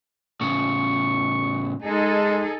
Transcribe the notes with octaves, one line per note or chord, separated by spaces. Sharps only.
A2 C#3 C#6
G#3 D#4 G#4 A4